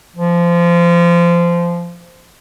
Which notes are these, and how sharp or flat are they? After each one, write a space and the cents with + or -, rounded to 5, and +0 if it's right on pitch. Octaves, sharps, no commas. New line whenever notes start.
F3 -20